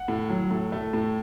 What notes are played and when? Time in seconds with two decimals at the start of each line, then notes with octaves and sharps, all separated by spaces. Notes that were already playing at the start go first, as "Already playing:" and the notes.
Already playing: F#5
0.08 A2
0.30 F#3
0.51 A2
0.72 A3
0.93 A2